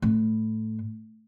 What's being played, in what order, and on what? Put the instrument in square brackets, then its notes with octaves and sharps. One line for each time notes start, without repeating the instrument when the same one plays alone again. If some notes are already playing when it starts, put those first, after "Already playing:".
[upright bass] A2